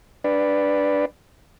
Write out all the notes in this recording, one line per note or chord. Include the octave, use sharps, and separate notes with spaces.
D4 B4 D5